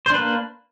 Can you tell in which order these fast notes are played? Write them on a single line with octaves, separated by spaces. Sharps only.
C5 D4 B4 A#3